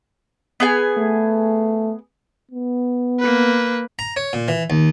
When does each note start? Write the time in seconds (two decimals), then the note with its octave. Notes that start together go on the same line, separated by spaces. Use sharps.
0.60 B3 G#4 G#5
0.98 A3
2.52 B3
3.20 A#3 B4
3.99 A#5
4.17 C#5
4.33 A#2
4.48 E3
4.70 D#2